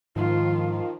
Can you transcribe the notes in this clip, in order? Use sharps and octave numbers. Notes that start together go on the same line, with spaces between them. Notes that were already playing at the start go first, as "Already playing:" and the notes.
G#2 D#3 F3 F4